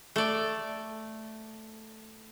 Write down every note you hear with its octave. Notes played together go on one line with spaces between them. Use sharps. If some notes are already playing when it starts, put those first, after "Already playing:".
A3 D5